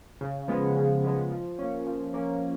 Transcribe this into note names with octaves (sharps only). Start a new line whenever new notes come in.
C#3
F3 G#3 B3
C#3
F3 G#3 B3
F3
A#3 C#4
F3
A#3 C#4